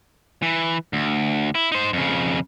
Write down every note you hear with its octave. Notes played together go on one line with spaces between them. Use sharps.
E3
D2
E4
D#4 C5
F2 C#3